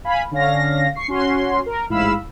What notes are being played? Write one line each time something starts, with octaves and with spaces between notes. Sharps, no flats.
F5 G#5 B5
D3 C#4 F5 A#6
C#6 C7
C#4 F#4 C6
A#4
A1 G#2 E4 F5 B5 E6